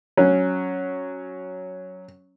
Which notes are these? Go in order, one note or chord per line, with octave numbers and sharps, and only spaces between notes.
F#3 C#4